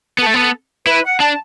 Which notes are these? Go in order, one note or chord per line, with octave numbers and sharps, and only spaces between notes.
B3 A4
A3
B3
E4 B4
F#5
D4 A5